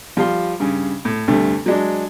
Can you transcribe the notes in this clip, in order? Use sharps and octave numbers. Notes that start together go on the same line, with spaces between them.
F3 G3 F4 C6
G2 C#3
A2
D2 G2 C3 A3
F#3 G#3 D4